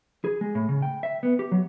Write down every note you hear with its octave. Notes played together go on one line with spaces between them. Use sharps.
G#4
G#3
A2
C#3
G5
E5
B3
G4
F#3